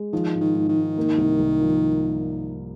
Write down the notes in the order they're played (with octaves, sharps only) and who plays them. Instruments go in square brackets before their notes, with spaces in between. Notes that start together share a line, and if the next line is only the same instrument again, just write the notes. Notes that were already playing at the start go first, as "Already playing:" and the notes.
Already playing: [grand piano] G#3
[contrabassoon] D#3 [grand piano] F3
[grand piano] G#2
[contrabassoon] D#3
[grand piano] G#2
[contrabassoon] D#3
[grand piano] G#2
A#3
C2
C2
F3